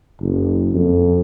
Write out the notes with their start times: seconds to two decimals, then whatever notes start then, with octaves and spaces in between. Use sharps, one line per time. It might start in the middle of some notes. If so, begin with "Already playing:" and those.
0.21 F#1
0.72 F2